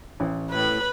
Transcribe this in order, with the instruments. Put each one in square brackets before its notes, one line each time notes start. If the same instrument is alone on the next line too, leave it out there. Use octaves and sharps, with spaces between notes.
[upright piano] A1
[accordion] A2 [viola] B4 B5